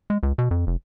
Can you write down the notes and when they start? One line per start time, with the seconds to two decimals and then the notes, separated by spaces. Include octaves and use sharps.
0.10 G#3
0.23 C#2
0.38 B2
0.51 F2
0.67 F1